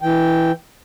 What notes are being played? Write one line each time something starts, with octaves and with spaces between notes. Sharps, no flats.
E3 G5